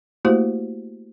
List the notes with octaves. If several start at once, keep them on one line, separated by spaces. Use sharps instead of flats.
A3 A#3 E4 F#4 G4 C5